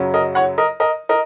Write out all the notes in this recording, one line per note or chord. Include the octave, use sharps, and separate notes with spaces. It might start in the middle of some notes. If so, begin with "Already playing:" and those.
Already playing: F#2 C#3 F#3 C#4
A#4 D#5
C#5 F#5
A#4 D#5
A#4 D#5
A#4 D#5